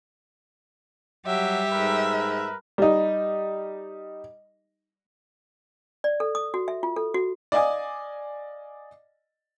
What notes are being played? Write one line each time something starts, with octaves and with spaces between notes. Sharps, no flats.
F#3 G3 G4 E5
G#2 A#4 B4
G3 D#4
D5
A4
D#6
F#4
E5
F4
A4
F#4
D5 D#5 F5 G#5 D6 D#6